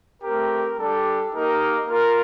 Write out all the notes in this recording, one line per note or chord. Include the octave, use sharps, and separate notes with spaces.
A3 C4 G4 A#4
G3 D4 G4 A4
A#3 D#4 G4 A#4
A#3 F4 A#4